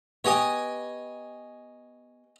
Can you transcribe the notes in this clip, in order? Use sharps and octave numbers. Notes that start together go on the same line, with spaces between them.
B3 G4 C#5 D#5 G5 G#5